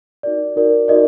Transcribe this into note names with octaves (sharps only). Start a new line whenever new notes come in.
D#4 F#4 A#4 D5
D#4 F#4 A#4 D5
D#4 F#4 A#4 D5 D#5